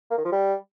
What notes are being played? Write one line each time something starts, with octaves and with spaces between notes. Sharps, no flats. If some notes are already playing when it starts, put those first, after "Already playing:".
A#3
D#3
F3
G3